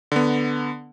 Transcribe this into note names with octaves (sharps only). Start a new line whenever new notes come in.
D3 B3